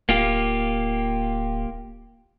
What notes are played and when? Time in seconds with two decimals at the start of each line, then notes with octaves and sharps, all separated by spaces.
0.09 D1 A#3 F4 G4